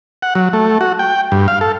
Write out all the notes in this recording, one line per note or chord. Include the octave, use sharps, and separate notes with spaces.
F#5
F#3
A3
F#4
G5
G2
F5
A4